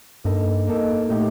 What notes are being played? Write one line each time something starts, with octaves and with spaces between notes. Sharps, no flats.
G2 A#3 D#4 A4 D#5
A#3 D#4 A4 D#5
A2 A3 D#4 G4